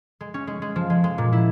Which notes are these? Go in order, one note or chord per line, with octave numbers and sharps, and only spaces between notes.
G#3
C#4
G#3
G#3
F3
G#3
G#3
A#2
E4